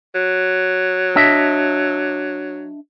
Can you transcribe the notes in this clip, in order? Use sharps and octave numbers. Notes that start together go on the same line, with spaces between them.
F#3
D4 D#5 E5